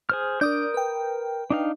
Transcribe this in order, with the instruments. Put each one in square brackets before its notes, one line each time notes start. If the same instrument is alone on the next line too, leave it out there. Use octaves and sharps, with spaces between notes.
[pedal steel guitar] G#4 C5 F6
[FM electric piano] D4 D5 [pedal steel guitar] A#4 D#6 G6
[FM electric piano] B4 G5
[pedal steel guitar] D4 D#4 F5